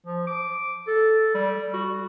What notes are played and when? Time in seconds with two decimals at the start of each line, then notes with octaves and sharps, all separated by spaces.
0.06 F3
0.27 D6
0.87 A4
1.34 G3
1.73 F#4